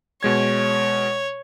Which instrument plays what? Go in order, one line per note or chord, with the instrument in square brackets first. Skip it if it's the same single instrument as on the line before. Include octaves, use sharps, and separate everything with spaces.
[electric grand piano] B2 G#3 G#6 [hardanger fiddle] C#5